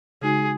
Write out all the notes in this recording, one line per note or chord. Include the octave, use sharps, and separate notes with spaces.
C#3 G#3 D#4 F#4 G#4